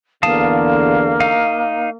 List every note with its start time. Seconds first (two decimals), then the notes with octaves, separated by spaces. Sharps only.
0.23 E2 D3 A#3 F5 A5 D#6
1.20 D#4 F5